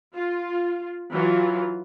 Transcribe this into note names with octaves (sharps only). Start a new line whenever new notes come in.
F4
E3 F#3 F4